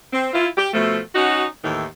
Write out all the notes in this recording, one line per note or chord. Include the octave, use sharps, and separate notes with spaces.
C4
E4 F4
G4
B2 F3 A3
C#4 D#4 F#4
D#2 A2 D#3 E3